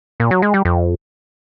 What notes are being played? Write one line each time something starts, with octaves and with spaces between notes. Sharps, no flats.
A#2
F#3
G#3
G3
F2